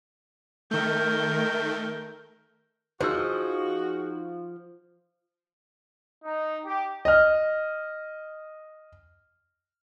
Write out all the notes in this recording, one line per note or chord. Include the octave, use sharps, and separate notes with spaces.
D#3 A3 A#4 G6
F3 D#4 F#4 G#4 C5 G#5 E6
D#4
G4
D#5 F6